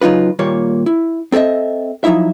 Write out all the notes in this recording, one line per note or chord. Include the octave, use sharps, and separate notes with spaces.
C#3 F#3 D#4 F4 B4
D#2 A#2 G3 A#3 C#5
E4
C4 A4 C#5 D#5 E5
F3 F#3 D#4 E4 E5